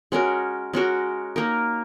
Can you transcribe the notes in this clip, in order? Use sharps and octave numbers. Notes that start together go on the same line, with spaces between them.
G#3 C#4 F#4 A#4
G#3 C#4 F#4 A#4
A#3 D#4 A#4